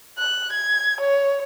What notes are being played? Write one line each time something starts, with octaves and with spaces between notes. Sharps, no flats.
F#6
G#6
C#5